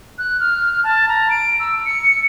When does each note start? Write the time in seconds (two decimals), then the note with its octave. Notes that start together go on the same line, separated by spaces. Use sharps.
0.18 F#6
0.40 F6
0.84 A5
1.08 A#5
1.30 D7
1.60 E6
1.86 C#7